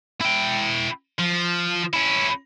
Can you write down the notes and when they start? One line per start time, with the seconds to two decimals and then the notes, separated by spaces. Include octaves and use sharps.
0.21 E4 G5
1.19 F3
1.94 C#4 E4